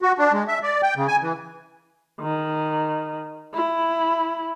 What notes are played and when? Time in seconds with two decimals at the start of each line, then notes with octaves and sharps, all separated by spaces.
0.02 F#4
0.19 D4
0.33 G#3
0.48 E5
0.63 D5
0.83 G5
0.96 C#3
1.08 G#5
1.22 E3
2.21 D#3
3.54 E4